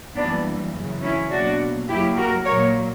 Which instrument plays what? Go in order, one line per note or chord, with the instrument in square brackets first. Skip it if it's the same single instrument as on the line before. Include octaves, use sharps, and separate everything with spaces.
[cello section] F#2 E3 G3 A#3 B3 D4
F#2 C#3 E3
C#4 E4
B2 F#3 A#3 D4 F#4
F#2 C#3 F#3 A#3 E4 G4
F#4 A#4
A#2 F#3 A#3 A#4 C#5